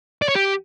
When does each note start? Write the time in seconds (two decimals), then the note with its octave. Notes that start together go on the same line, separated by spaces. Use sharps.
0.22 D5
0.29 C#5
0.35 G4